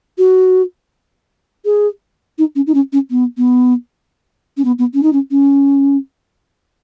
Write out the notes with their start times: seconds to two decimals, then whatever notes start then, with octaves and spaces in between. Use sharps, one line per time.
0.18 F#4
1.65 G#4
2.38 D#4
2.55 C#4
2.67 D#4
2.74 C#4
2.92 C#4
3.10 B3
3.37 B3
4.57 C#4
4.64 B3
4.78 B3
4.94 C#4
5.03 D#4
5.13 C#4
5.31 C#4